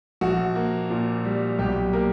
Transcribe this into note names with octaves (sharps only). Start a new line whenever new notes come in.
A#1 F#4
A#3
A#2
G3
B1 G4
A#3 A#4